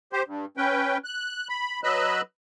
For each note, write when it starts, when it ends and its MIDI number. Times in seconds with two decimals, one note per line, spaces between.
0.13 0.22 67
0.13 0.22 72
0.27 0.45 43
0.57 0.97 61
0.57 0.97 71
0.57 0.97 79
1.04 1.48 90
1.49 1.80 83
1.84 2.21 54
1.84 2.21 71
1.84 2.21 75
1.84 2.21 83
1.84 2.21 88
1.84 2.21 90